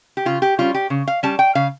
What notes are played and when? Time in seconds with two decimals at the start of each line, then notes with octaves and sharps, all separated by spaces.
0.17 G4
0.25 C#3 F4
0.42 G4
0.59 G3 C#4 F4
0.74 G4
0.90 C#3
1.08 F5
1.23 G3 C#4 A5
1.39 G5
1.55 C#3 F5